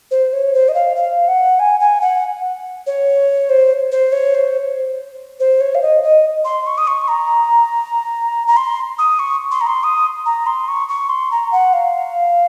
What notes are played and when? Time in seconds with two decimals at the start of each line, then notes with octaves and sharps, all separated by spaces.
0.11 C5
0.33 C#5
0.54 C5
0.68 D#5
0.74 F5
0.96 F5
1.28 F#5
1.59 G#5
1.80 G#5
2.01 F#5
2.87 C#5
3.50 C5
3.92 C5
4.12 C#5
4.35 C5
5.40 C5
5.61 C#5
5.75 F5
5.82 D#5
6.03 D#5
6.45 C6
6.67 C#6
6.78 D#6
6.87 C#6
7.08 A#5
8.47 A#5
8.57 C6
8.98 D#6
9.19 C#6
9.51 C6
9.61 A#5
9.67 C6
9.84 D#6
10.26 A#5
10.46 C6
10.68 C#6
10.89 C#6
11.09 C6
11.31 A#5
11.52 F#5
11.73 F5